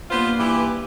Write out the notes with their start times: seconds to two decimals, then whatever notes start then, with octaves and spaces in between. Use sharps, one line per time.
0.11 G2 A#3 B3 F4 C5
0.39 E3 G4